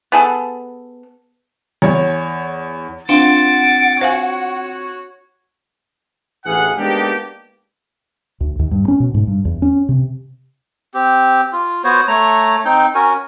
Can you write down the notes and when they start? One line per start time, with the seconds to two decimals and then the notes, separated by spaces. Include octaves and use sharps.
0.12 B3 G#4 A4
1.82 E2 C#5
3.09 C4 D4 F4 F#5 A6 D7
4.01 F#4 C5 C#5 F5 G#5
6.45 A1 D2 E3 G#4 F5 F#5
6.78 G#3 A#3 B3 D4 D#4 G4
8.40 D2
8.59 D#2
8.71 G2
8.88 C#4
9.00 B2
9.14 G#2
9.27 G2
9.45 E2
9.62 C#4
9.89 C3
10.94 C4 G4
11.53 F4
11.84 B3 F#4 C5 C#5
12.08 A3 C#5 A#5
12.65 C4 D#4 G5
12.95 C#4 F#4 A#4 G#5